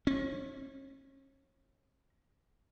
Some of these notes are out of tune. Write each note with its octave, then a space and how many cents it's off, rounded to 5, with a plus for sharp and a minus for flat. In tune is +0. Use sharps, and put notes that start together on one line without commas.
C#4 -40